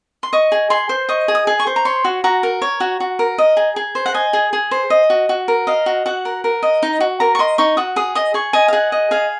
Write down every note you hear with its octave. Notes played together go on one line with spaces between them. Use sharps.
C6
D#5 C#6
G#4
G#4 C6
C5
D#5 C#6
G#4
D#6
G#4
C#6
C5
A#5
C#5 C6
F#4
F#4 A#5
A#4
C#5
F#4
F#4
A#4
D#5
G#4
G#4
C5
F#5
D#5 G#5
G#4
G#4
C5
D#5
F#4
F#4
A#4
D#5 F5
F#4
F#4 F#5
A#4
A#4
D#5
D#4
F#4
A#4 A#5
C#6
D#5 C6
D#4 C#6
F#4 D#6
G#4 D#6
D#5 D#6
G#4 C#6
D#5 G#5
F5
G#4 F#5
D#5
G#4 F5